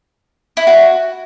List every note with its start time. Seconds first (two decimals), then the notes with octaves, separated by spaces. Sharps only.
0.57 E4
0.67 F#4